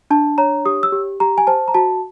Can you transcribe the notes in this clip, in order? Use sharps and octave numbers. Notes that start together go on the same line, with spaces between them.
D4 A5
C#5 A#5
G4 D#6
E6
G4
G4 A#5
G#5
C5 A5
A#5
F#4 A5